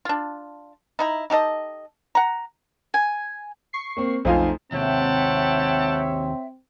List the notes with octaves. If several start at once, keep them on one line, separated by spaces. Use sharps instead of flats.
D4 F4
D#4 E4 A#5
D#4 G4 A4 D#5
F#5 A#5
G#5
C#6 C7
A#3 C4
B1 F2 A3 D#4 F4 C5 F5 G#5
D#2 C3 C4 C#5 E5 F#5 G5 A5